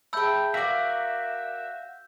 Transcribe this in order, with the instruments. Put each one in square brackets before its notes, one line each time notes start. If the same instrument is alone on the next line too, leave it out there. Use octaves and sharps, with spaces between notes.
[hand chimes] G#4 E5 A5 [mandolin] G5 B5 [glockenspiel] E6 G6
[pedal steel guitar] F#4 E5 [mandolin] A#4 D5 [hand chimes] F5